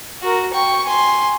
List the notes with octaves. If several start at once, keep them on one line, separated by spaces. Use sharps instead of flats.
F#4 A#4
G5 C#6
G#5 C6